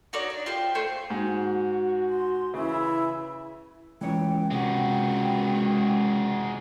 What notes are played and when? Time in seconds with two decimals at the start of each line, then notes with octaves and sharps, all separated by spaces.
0.13 D#4 F#4 C#5 D5
0.30 D4
0.46 F4 G4 C5
0.75 A3 C5 G6
1.10 G#2 F#4
2.10 C6
2.54 C#3 E3 E4
4.01 C#2 E3 C#5 G5
4.51 C3 G#3 F#4 G5